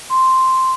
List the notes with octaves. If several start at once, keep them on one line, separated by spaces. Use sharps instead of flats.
C6